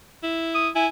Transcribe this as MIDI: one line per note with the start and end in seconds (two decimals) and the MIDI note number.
0.23 0.70 64
0.55 0.69 87
0.76 0.87 64
0.76 0.87 80